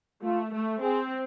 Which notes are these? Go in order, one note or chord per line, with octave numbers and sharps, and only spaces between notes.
A3 F4
A3
C4 G#4